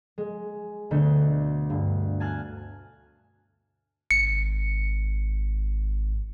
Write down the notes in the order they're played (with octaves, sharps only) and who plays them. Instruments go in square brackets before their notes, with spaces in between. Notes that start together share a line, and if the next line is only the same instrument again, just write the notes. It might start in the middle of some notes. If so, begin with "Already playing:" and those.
[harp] G#3
D2 B2 D3 A3 G6
G2
G#5 A5 F6 F#6 C7
[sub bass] G#1 [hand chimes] C#7